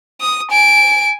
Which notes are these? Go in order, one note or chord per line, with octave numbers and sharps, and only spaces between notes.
D#6
G#5 D7